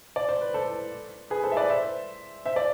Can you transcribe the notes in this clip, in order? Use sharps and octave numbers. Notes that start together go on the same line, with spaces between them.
D5
C5
B4
A4 C5
G#4 B4
A4 C5
E5
B4 D5
C5 E5
C5 E5
D5